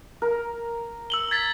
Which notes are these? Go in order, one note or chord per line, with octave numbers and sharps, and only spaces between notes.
A#4
E6 F#7 G7
G#6 A6 B6